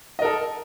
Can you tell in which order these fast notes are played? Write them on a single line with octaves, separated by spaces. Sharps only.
D#5 A#4 A4